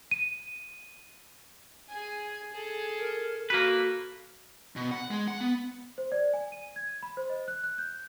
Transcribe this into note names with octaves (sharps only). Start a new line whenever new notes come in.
D#7
G#4 G#5
G#4 A4
A#4
A#3 F#4 A4 B4
B2
F#5
G#3
F#5
B3
C5
D5
G#5
D#7
G#6
B5
C5
D#5
F#6
F#6
G6